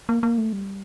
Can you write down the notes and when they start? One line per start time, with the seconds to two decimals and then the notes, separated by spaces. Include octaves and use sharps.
0.09 A#3
0.23 A#3
0.38 A3
0.53 G3